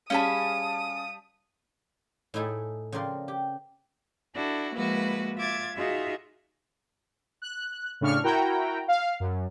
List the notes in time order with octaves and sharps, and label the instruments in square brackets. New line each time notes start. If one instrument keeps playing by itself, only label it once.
[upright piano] G3 A5 [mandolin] C#4 G#4 B5 [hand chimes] F5 [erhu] D#6
[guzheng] A2 D#4 E4 G#4 A4
C#3 F3 C4 A#4 D5 C6
G4
[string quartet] D4 E4 F#4 A4
F3 G#3 A#3 E4 F#4 B4
F4 E5 D6 G#6 A6
D#4 F4 F#4 G#4 E5
[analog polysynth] F#6
A2 C#3 D4 C#6 F6
E4 F#4 A#4 G5 A#5
F5
F#2